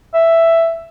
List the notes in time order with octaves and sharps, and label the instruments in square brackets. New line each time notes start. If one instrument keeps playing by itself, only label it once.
[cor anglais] E5